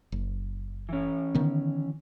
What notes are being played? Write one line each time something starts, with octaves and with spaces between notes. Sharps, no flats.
F#1
E3 C#4
D3 D#3 B3